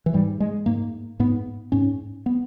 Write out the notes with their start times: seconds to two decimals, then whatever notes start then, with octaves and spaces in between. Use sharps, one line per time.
0.06 E3
0.14 G#2 G3
0.40 G#3
0.66 G#2 A#3
1.20 G#2 B3
1.72 G#2 C#4
2.26 B3